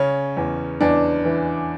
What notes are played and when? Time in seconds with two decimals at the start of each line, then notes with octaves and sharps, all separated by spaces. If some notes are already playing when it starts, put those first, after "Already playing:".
Already playing: C#3 C#4
0.37 E2
0.81 E2 D4
1.25 E3